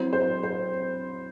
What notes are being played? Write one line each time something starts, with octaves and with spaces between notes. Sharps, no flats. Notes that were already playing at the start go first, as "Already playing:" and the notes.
Already playing: F#3 C4 E4 C5
C5
C5